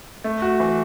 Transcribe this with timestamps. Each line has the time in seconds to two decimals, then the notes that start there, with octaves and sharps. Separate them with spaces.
0.24 A3
0.42 F#4
0.60 E3